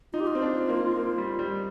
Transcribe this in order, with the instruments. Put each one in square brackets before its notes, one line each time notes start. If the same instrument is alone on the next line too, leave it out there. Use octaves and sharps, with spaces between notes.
[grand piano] D#4 [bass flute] F4
[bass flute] G4
F4
[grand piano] C4
D4
A#3
A#3
G3
G3